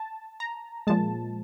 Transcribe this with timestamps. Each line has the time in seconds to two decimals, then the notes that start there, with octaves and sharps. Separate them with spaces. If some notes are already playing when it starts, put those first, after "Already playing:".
Already playing: A5
0.40 A#5
0.87 A#2 F3 G#3 A5